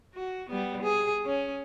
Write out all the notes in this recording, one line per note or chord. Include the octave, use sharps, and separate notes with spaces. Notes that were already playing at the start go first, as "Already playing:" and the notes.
F#4
G3 B3
G#4
C#4